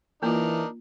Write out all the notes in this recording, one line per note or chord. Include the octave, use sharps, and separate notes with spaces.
E3 A#3 D4 D#4 F4 A#4